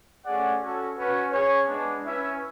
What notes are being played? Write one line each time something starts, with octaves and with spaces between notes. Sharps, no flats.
A3 C#4 G#4 D5 F#5
C#4 F#4 A4
C#4 F#4 B4
C#4 G#4 C#5
G#3 B3 D4
C#4 E4 B4 E5